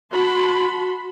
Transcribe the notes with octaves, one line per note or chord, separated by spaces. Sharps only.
F#4 A5 B5 C6